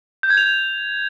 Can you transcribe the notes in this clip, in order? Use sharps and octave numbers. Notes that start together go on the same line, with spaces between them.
G6
G#6
F7